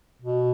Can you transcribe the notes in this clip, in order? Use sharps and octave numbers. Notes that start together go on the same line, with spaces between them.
B2